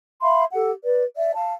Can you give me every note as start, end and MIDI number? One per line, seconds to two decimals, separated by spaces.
0.22 0.44 76
0.22 0.44 77
0.22 0.44 83
0.22 0.44 84
0.54 0.72 67
0.54 0.72 69
0.54 0.72 78
0.83 1.04 71
0.83 1.04 74
1.16 1.31 74
1.16 1.31 76
1.34 1.52 77
1.34 1.52 81